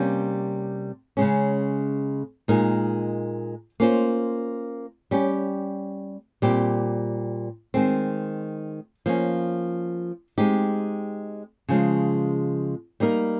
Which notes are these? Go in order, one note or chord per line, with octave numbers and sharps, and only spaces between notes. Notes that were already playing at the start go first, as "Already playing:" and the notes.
Already playing: C3 G3 A#3 C#4
C#3 G#3 C#4
A#2 G#3 D#4 A#4
A#3 C#4 F4 C5
G3 C#4 G4
A#2 G3 C4 G4
D#3 G#3 C4
F3 A#3 C#4
G#3 C4 D#4 G4
C#3 F3 G#3
G3 A#3 D#4 A#4